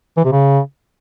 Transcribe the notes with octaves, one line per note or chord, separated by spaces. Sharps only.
E3
C3
C#3